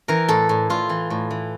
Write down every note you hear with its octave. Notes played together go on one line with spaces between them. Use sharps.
E3 A#4
A2 A4
A2
A2 F4
E3
A2
E3